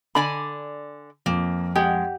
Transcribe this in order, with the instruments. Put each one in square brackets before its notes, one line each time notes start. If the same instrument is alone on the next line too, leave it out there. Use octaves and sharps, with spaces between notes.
[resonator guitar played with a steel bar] D3 D5 G#5 [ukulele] B5
[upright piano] F2 [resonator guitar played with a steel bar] A#3
[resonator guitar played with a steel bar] G#3 [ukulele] G4 F#5